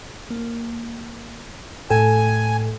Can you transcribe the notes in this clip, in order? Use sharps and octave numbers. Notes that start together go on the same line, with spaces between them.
A#3
A2 A4 G5 G#5